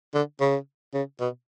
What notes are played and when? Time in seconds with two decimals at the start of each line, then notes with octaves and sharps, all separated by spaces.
0.14 D3
0.40 C#3
0.94 C#3
1.20 B2